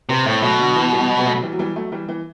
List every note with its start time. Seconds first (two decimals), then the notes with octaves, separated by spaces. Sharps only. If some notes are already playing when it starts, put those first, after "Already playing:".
0.09 C3 G4 B4
0.26 A2 A3 C4
0.42 B2 F#3 A3
0.59 D3 F#3
0.76 E3
0.92 E3 G3
1.11 F#3
1.19 G3
1.26 F#3 A3
1.42 E3 G3
1.52 F#3
1.59 E3 G3
1.75 F#3 A3
1.92 E3 G3
2.09 E3